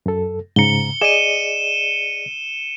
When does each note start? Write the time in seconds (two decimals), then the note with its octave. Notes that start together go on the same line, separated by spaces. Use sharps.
0.06 F#2 A4
0.56 G#2 C#3 A#5 C#7 G7
1.01 G#4 D5 D#5 D#7 E7